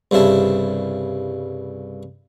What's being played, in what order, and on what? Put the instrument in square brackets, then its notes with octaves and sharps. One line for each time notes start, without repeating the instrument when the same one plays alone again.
[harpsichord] C2 G2 C#3 E4 A5